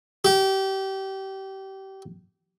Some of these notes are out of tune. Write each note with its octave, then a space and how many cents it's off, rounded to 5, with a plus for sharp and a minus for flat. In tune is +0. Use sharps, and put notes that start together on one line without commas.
G4 -25